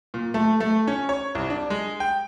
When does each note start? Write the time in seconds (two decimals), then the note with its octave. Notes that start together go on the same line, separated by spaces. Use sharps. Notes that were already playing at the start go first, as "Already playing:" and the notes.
0.14 A#2
0.34 A3
0.60 A3
0.87 C#4
1.09 C#5
1.35 C2
1.50 D4
1.70 G#3
2.00 G5